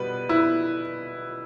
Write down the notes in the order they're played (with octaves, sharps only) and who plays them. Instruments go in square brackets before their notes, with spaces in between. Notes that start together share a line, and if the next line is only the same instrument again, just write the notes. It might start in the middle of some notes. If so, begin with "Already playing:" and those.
Already playing: [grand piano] B2 G3 B3 [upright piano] B4
[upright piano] E4